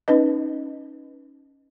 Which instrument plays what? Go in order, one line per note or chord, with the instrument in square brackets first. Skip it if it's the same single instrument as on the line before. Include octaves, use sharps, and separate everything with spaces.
[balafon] C#4 D#4 B4 D#5